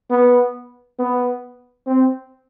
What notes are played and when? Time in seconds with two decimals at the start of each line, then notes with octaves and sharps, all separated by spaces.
0.10 B3
0.99 B3
1.87 C4